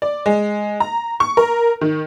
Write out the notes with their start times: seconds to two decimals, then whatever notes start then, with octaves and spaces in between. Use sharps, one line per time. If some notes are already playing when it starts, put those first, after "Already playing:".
0.02 D5
0.26 G#3
0.80 A#5
1.20 C#6
1.37 A#4
1.81 D#3